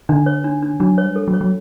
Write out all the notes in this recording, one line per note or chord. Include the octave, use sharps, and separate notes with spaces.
D3 D4
C#5
D4
D4
F#3 D4
C#5
G3
A4
F#3
C#5
F#3